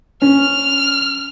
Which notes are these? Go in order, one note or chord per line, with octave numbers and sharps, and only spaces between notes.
C#4 F6